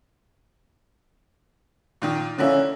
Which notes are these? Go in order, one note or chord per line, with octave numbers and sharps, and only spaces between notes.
A#2 D#3
D3 A#3 C#4 E4